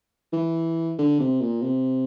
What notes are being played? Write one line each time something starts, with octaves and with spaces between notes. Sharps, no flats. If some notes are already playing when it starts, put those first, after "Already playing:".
E3
D3
C3
A#2
C3